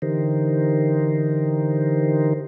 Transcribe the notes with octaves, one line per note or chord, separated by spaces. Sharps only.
D3 E3 D#4 G4 A#4 C5